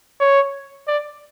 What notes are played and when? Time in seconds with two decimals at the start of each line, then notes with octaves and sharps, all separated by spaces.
0.20 C#5
0.87 D5